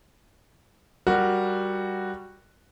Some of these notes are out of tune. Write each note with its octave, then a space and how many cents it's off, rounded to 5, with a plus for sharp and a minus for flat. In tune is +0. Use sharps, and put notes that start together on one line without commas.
G3 +0 F#4 +0 A#4 +0